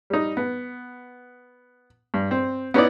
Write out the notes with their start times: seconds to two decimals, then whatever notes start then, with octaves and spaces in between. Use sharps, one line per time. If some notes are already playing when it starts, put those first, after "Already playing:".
0.10 G3 D#4
0.37 B3
2.14 G2
2.31 C4
2.74 B3 C#4 D#4 E4 B4 D5